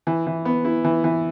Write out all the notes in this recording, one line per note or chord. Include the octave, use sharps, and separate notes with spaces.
E3
E3
B3
E4
E3
E3